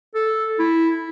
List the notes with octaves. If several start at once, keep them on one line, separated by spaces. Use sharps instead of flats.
A4
E4